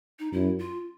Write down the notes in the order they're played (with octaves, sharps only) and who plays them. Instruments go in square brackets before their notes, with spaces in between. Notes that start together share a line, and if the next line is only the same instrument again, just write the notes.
[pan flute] D#4
[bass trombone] F#2 [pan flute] E4
[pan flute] F4